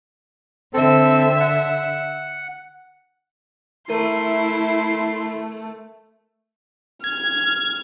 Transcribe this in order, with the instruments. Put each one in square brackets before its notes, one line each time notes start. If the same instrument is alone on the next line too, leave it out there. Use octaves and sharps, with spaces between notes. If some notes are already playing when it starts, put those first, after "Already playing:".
[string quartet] D3 E5 [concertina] C4 A4
[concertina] F#5
[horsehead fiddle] A3 [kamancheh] E4 [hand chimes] A#4 [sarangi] C6
[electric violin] F6 [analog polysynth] G#6